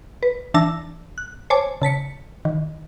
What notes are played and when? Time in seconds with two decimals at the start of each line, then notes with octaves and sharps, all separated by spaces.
0.23 B4
0.54 E3 D4 A5 E6 A#6
1.18 F#6
1.50 C5 C#5 G#5 A5 D6
1.82 C#3 A5 B6 C#7
2.45 D#3